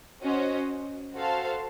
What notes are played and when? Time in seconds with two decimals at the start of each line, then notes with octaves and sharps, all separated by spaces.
0.22 C#4 F#4 C5 D#5
1.14 F#4 A4 C5 F5 A5